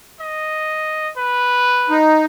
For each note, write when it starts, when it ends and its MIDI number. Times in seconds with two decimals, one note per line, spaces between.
0.20 1.12 75
1.17 1.98 71
1.90 2.26 63